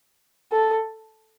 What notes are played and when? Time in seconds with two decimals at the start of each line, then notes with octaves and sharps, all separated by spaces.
0.52 A4